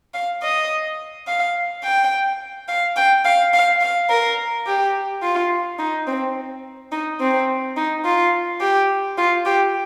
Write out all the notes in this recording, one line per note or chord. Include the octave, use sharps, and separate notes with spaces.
F5
D#5
F5
G5
F5
G5
F5
F5
F5
A#4
G4
F4
D#4
C4
D#4
C4
D#4
F4
G4
F4
G4